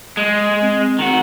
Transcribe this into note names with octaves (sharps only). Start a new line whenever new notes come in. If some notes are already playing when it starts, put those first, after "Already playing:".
G#3
C4
D#3 F#4